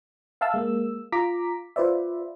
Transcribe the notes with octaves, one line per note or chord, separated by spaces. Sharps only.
E5 F5 A5 E6
G#3 A#3 E6
F4 A#5 D6 B6
F4 B4 C5 D5 E5